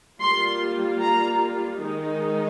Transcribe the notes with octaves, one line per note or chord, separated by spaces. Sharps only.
G3 A#3 F4 C6
A#5
D#3 G#3 D#4